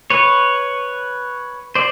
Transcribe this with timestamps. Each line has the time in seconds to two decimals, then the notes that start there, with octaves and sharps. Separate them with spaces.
0.10 B4 C#5
1.75 C5 D5